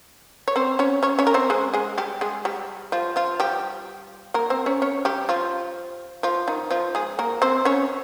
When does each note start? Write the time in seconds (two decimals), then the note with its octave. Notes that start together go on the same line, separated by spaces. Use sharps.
0.48 C#5
0.56 C4 C5
0.79 C#4 C#5
1.03 C#4 C#5
1.19 C#4 C#5
1.27 A#4
1.34 C4 C5
1.50 G#3 G#4
1.73 G#3 G#4
1.98 G3 G4
2.21 G#3 G#4
2.45 G3 G4
2.92 F3 F4
3.16 F3 F4
3.40 G3 G4
4.34 A#3 A#4
4.50 C4 C5
4.66 C#4 C#5
4.82 C#4 C#5
5.05 G3 G4
5.29 F3 F4
6.23 F3 F4
6.48 D#3 D#4
6.71 F3 F4
6.95 G#3 G#4
7.19 A#3 A#4
7.42 C4 C5
7.65 C#4 C#5